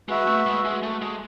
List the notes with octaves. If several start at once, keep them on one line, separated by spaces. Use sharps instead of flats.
G#3 F#4 B4 E5
A3
G#3
G#3
A3
G#3